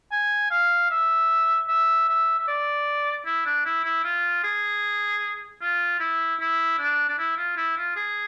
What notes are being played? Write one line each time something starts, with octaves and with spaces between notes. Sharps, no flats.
G#5
F5
E5
E5
E5
E5
D5
E4
D4
E4
E4
F4
G#4
F4
E4
E4
D4
D4
E4
F4
E4
F4
G#4